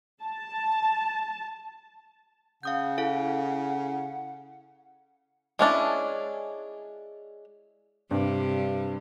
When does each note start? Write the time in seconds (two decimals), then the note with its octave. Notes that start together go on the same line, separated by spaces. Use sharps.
0.22 A5
2.63 C#3 F5 F#5 D#6 G6
2.98 E4 A4 F5
5.59 G#3 C#4 D4 E4
8.11 G2 C3 G3